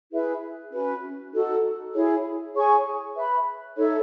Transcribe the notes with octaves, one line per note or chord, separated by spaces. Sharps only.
E4 G#4 B4 E5
C#4 F#4 B4
D#4 F#4 A4
E4 G#4 C#5
G#4 C#5 G#5 C#6
B4 E5 B5
D#4 A4 C#5 E5